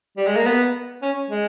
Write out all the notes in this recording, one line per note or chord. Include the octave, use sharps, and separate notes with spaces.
G3
G#3
A#3
B3
C#4
G#3